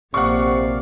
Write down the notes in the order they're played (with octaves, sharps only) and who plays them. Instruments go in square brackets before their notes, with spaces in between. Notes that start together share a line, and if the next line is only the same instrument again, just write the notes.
[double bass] A#1 A#3 [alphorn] C3 [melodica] D5 F5 [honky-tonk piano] F#5 C#6